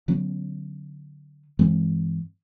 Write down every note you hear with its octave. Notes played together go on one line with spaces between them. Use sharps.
D3 F#3 B3 C#4
G2 E3 G#3 C4